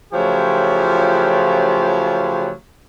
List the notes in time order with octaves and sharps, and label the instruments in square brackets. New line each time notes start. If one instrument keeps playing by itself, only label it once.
[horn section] C#3 F3 F#3 A3 F4 G4